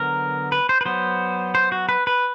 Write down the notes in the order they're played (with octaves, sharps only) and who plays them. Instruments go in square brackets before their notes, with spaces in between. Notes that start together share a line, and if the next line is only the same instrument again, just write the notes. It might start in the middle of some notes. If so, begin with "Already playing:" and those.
Already playing: [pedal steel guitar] D3 F#3 B3 A#4
B4
C5
B4
F#3 B3 C5
C5
F#4
B4
B4